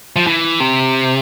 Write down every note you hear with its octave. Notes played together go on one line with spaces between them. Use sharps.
F3
E3
C3